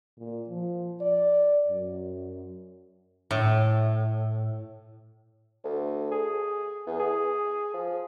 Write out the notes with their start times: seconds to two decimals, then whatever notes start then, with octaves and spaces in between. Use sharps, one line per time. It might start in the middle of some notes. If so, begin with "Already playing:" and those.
0.18 A#2
0.49 F3
1.01 D5
1.68 F#2
3.31 A2
5.64 D2
6.11 G#4
6.86 E2
6.99 G#4
7.74 F3